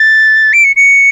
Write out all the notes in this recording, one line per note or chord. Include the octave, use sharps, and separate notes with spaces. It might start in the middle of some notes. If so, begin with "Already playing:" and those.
Already playing: A6
D7
C#7
C#7